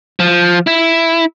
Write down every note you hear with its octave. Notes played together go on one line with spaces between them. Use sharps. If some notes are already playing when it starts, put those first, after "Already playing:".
F3
E4